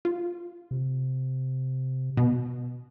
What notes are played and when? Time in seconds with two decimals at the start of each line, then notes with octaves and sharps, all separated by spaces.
0.05 F4
0.71 C3
2.17 B2